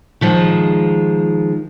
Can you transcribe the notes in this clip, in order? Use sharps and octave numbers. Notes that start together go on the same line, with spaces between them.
D#3 F3 G#3